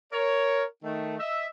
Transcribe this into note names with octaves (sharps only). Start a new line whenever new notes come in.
A#4 C#5
D#3 A3
D#5 E5